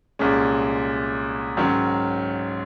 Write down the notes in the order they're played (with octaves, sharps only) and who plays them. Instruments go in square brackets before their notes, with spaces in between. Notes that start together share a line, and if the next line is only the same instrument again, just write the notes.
[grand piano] C2 A#2 G#3 C#4
G#2 D#3 F#3 C#4